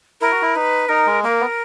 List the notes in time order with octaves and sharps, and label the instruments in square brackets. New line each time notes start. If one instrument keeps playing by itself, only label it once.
[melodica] E4 [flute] A#4
[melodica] F#4
E4
[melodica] D#4 [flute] B4
[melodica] D#4 [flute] A#4
[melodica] G#3
[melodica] A#3 [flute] A#4
[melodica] B3